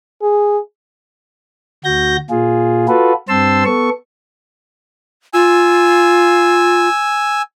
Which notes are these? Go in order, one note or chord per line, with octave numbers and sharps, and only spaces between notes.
G#4
D2 F#4 G6 A#6
A#2 F4 G#4
F4 F#4 A4 B4
G2 C4 C5 A5 C6 E6
B3 A4 C#6
F4 G#5 E6